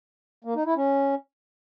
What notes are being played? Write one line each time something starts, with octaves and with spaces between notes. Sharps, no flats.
A#3
D#4
E4
C#4